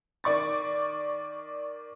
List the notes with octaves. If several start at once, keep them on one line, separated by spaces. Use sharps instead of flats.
D#3 D5 C#6 A6